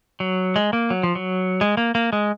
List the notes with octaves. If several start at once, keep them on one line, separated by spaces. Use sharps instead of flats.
F#3
G#3
A#3
F#3
F3
F#3
G#3
A#3
A#3
G#3